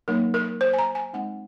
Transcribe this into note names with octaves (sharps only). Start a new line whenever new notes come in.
F#3 A#3 D#4 A#4
A#4
C5
G#5
A#5
G#5
G#3 C4 D#4 F#5